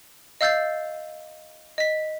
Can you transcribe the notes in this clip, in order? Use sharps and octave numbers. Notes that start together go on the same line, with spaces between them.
D#5 F5 E6 G6 A6 C7
D#5 B6